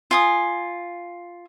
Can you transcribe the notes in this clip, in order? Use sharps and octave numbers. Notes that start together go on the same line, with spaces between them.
F4 G#5 D#6